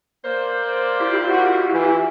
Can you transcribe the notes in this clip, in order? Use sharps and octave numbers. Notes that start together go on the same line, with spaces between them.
A#3 C5 D5
E4 F4 G4
F#4
E3